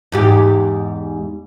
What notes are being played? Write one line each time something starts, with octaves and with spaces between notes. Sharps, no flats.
E2 G#2 G4